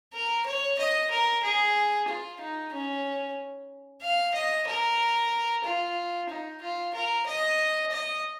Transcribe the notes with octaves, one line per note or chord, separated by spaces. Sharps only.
A#4
C#5
D#5
A#4
G#4
F4
D#4
C#4
F5
D#5
A#4
F4
D#4
F4
A#4
D#5
D#5